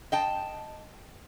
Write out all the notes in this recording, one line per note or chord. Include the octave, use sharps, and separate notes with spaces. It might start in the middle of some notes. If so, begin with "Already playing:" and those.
D#5 G5 A5